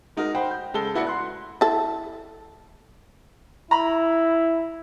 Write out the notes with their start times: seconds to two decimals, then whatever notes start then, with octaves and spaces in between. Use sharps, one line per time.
0.17 G#3 D#4 F#4 A#4
0.35 C5 F#5 G5 B5
0.51 G6
0.74 C#3 G#3 A4 G7
0.94 B3 E4 F#4 D5 C#7
1.07 C6 F#6
1.61 E4 A4
3.71 E4 A#5 B5